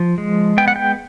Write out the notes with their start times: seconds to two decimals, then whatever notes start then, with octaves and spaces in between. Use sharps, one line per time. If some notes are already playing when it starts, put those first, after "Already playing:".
Already playing: F3
0.18 G#3
0.57 B3 G5
0.68 F#5
0.76 G5